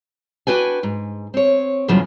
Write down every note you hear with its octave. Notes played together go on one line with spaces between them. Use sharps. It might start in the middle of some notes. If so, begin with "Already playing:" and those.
D4 F#4 B4 G5 G#5
G#2
C4 C#5
E2 G2 C#3 F3 F#3